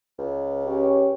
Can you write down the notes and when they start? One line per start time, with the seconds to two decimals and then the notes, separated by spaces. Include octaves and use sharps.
0.18 C#2
0.66 C#4 G4 C#5